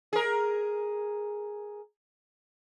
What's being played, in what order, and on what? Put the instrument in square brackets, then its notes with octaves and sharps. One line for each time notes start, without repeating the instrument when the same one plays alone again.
[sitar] G#4 A#4